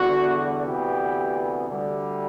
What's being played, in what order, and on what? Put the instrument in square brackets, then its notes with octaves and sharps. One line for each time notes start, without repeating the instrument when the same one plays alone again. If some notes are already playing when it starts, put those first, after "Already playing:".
Already playing: [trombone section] E2 D3 G3 B3 F#4
D2 C3 E3 B3 G4
D2 D3 G3